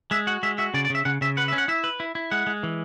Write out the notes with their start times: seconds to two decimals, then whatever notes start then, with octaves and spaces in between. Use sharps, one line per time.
0.11 G#3 E5
0.27 F#4 F#5
0.43 G#3 E5
0.58 F#4 E5
0.74 C#3 D5
0.85 D5
0.90 C#3 E5
1.05 C#3 F#5
1.21 C#3 E5
1.37 B4 F#5
1.48 E5
1.53 C#4
1.58 F#5
1.68 E4 E5
1.84 B4
2.00 E4
2.15 E4
2.31 G#3 F#5
2.47 G#3
2.63 E3